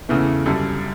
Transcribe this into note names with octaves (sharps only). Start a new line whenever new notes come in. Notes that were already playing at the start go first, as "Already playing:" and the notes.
E2 C#3 E3 A3
F#2 D3 G3